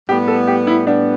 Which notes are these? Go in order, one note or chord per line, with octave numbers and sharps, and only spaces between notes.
A2 G3 B3 G4
A4
G4
E4
A2 G3 B3 D4